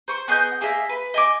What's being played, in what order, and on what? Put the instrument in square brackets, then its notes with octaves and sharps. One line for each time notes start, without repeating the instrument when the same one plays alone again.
[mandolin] C5 C#6
B3 G#4 D#5 G6
A#3 G#4 D#5 E5
B4
D#5 G#5 D6